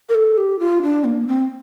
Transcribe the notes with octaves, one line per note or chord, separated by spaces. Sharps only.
A#4
A4
G4
F4
D4
A#3
C4